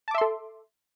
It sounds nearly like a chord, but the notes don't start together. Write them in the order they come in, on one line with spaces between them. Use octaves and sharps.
A5 D6 E5 C6 A4